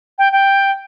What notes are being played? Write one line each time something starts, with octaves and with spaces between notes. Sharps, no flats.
G5
G5